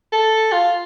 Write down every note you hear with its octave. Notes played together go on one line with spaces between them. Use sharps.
A4
F4